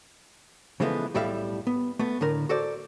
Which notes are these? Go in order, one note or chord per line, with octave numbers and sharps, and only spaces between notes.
C#3 E3 F3 G#3 A3 B3
B1 A2 G3 A4 E5 F5
B3
A3 B3
A2 D3 A#4
F#4 A4 C5 D5